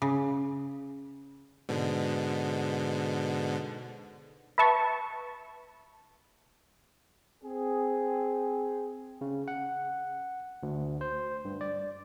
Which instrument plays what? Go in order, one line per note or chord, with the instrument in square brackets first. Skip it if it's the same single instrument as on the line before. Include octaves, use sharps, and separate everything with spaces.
[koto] C#3
[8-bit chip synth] G#2 B2 D3
[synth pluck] B4 E5 A5 C#6
[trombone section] C4 G#4
[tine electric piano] C#3
F#5
D2
C5
G2
D5